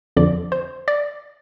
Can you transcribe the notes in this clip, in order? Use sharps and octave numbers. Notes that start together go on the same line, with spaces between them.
F2 D3 F3 D5
C5
D5